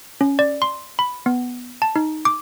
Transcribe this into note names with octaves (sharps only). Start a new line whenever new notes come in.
C#4
D5
C6
B5
B3
A5
D#4
D6